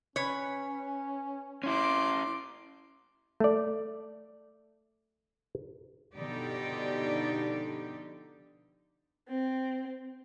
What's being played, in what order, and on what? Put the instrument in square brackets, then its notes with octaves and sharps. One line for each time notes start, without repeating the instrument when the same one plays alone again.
[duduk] C#4 [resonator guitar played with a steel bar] B4 C#5
[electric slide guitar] C#4 E4 [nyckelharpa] C6 D6
[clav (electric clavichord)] A3 D5
[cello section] B2 D3 F3 D#4 G4 D5
[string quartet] C4